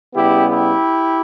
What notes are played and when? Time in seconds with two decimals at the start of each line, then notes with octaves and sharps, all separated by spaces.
0.12 C#3 G3 B3 E4 G4
0.49 E4 G4